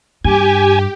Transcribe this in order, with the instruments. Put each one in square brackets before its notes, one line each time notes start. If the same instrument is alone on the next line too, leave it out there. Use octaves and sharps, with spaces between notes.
[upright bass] G2 [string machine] G4 [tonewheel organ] G#5